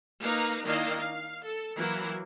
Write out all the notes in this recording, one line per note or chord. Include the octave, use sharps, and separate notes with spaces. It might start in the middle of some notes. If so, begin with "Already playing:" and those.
A#3 D#4 B4 F5 A#5
D#3 A#3 D4 E4 D#5 F5
F5
A4
E3 F#3 A#3 E4